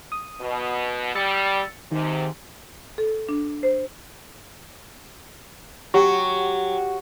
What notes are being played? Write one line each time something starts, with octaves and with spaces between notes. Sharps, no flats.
D#6
B2
G3 E6 A6 C#7
G#2 C3 D#3
A4
D4
C5
F#3 G4 C#6